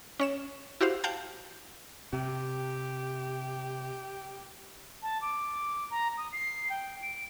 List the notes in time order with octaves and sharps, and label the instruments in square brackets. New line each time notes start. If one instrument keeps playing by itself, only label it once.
[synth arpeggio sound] C#4 C#5 E7
E4 F#4 G4 C5 F5
F5 G5 A5 G6
[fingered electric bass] C3 [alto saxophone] G4
[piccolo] A5
D6
A#5
D#6
C7
G5
D7